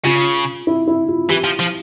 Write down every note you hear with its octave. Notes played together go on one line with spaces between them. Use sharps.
C#3 F4
E4
E4
F4
E3 G4
F3
F3